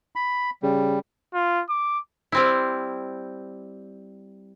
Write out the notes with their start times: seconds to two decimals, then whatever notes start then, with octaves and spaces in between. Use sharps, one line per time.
0.16 B5
0.63 C#3 G3
1.34 F4
1.70 D6
2.32 G3 C4 E4